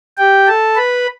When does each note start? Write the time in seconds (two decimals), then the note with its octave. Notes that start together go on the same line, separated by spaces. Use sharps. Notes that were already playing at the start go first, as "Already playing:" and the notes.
0.18 G4 G5
0.47 A4 A5
0.76 B4 B5